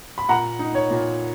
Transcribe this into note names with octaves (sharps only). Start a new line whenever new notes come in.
B5
A#2 F#5 A#5
D#4
C#5
A#2